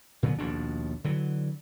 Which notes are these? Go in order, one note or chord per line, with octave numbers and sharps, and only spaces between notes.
A#2 D3 F#3 B3
A#1 D#2 B2 D4
D3 E3 F#3